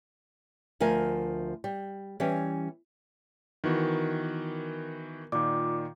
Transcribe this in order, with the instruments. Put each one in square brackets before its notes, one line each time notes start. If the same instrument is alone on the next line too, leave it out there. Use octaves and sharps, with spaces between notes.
[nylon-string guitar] D2 F3 A#4 G#5
G3
E3 G3 C#4
[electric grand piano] D#3 E3 F#4 [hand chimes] B3 A#4
[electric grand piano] A#2 D#3 [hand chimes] F4 D5 D6